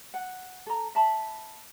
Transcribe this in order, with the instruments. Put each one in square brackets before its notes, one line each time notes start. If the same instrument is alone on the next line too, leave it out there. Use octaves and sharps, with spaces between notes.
[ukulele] F#5
A4 A#5
E5 A5 B5